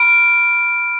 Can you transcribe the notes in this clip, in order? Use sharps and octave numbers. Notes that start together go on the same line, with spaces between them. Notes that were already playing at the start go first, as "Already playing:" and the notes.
Already playing: B5 F6 D7